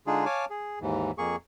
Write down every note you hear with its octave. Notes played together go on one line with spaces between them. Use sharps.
D3 G#3 D4 D#4 F4 G#4
C#5 F5 G#5 A5 D6
G#4
D#2 G#2 E3
F2 A#3 G#4 C#6